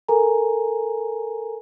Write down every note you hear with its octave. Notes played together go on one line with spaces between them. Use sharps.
A4 A#4 G#5 A#5